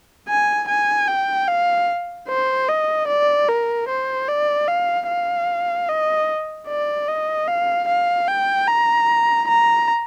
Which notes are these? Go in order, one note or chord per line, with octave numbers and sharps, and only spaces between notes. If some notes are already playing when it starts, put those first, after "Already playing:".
G#5
G#5
G5
F5
C5
D#5
D5
A#4
C5
D5
F5
F5
D#5
D5
D#5
F5
F5
G5
A#5
A#5